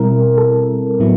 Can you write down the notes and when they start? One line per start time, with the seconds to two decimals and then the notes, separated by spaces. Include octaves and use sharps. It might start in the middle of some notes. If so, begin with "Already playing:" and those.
Already playing: B2 G3 C4 E4 A#4
0.38 A4
1.00 A2 F#3 B3 E4